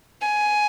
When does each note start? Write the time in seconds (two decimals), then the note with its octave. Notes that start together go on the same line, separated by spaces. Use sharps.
0.21 G#5